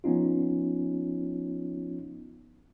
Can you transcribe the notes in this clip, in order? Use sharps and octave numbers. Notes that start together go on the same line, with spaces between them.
F3 B3 C#4 D#4 F4